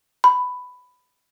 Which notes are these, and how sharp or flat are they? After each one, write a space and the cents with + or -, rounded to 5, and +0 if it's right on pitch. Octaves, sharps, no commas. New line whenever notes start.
B5 +10